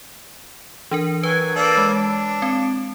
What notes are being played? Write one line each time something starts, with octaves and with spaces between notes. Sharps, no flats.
E3 D4 A#4
F#3 B4 G#5
A#3 A4 D5
G#3
D4
C4